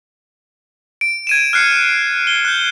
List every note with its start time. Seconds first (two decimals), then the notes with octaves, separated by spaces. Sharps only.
1.01 D7
1.27 G#6 D#7 E7
1.53 F6 F#6 C7 C#7
2.27 G7
2.45 F#6 G6